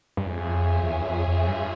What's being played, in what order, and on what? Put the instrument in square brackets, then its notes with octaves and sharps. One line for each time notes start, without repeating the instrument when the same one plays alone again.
[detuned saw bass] G2
[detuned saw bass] F2 [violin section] F4 G#4 C#5 E5 G#5
[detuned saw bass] F2
E2
G2
F2
F2
G2